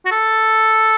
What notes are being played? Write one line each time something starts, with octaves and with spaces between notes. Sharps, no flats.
F#4
A4